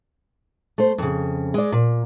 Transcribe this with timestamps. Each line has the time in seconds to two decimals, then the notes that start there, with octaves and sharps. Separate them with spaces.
0.78 A3 C5
0.98 F2 C#3
1.54 G#3 D5
1.72 A#2